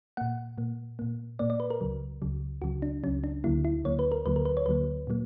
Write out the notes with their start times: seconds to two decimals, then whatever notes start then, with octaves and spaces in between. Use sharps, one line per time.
0.17 A#2 A#3 F#5
0.58 A#2 A#3
0.99 A#2 A#3
1.39 A#2 A#3 D5
1.50 D5
1.60 B4
1.70 A#4
1.81 C#2 C#3 F#3
2.22 C#2 C#3 F#3
2.62 C#2 C#3 F#3 F#4
2.82 D4
3.04 C#2 C#3 F#3 C#4
3.24 D4
3.44 D2 D3 F#3 A#3 E4
3.65 E4
3.84 D2 D3 F#3 A#3 C#5
3.99 B4
4.12 A#4
4.26 D2 D3 F#3 A#3 B4
4.36 A#4
4.45 B4
4.57 C#5
4.66 D2 D3 F#3 A#3 B4
5.07 A#2 F#3 A#3